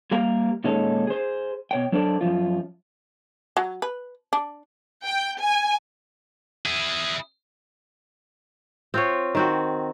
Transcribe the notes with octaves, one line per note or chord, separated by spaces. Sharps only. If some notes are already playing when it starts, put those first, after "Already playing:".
G3 A#3 A#4 F5 A#5
A#2 D#3 G#3 C#4 D#4 A4
G#4 C5
B2 C#5 G5
F#3 D4 A4 A#4 C5 D5
F#2 A#2 F3 F4
F#3
B4
D4
G5
G#5
E4 G#4
C4 F4 C#5
D#3 C4 F#4